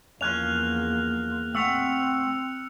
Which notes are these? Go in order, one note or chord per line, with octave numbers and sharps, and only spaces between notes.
E2 F3 A#3 C#4 F6 F#6 F7
A3 C4 F#5 E6 C#7 F7